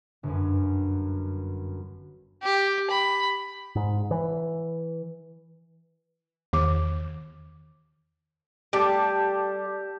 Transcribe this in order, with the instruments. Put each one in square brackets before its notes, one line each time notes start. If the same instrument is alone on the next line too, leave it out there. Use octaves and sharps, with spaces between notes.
[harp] G1 F#2
[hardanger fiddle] G4
B5
[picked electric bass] G#2
E3
[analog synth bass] E2 [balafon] D#3 D6
[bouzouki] G3 A5 [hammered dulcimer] G4 A4